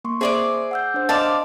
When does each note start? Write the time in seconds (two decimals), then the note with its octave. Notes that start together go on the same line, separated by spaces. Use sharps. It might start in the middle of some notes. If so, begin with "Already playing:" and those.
0.04 A#3 C6 C#6
0.21 G#4 C5 D5 E5 D6
0.71 F#5 E6 G6
0.94 D4 C5
1.09 D5 D#5 F5 A5 C6 D6